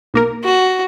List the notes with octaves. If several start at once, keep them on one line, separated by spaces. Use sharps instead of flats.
B1 A#3 A#4
F#4